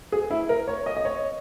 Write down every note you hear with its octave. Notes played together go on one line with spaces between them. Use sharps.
G#4
E4
A#4
C#5
D#5
D#5
C#5